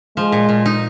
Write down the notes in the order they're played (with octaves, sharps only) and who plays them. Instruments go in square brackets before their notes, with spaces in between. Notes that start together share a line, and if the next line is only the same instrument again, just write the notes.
[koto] F3 [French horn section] G#3
[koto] A#2
A#2
D#4